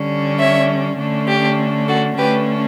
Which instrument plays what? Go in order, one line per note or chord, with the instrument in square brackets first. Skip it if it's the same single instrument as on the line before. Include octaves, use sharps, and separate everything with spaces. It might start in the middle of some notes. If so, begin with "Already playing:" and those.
Already playing: [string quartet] D3 G3 C#4
C#5 E5
D3 A3 C#4
G4
F#4 A4
D3 A3 C#4 G4 B4